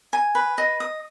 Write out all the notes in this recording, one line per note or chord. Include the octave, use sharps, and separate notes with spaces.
G#5
B4
D#5
D#6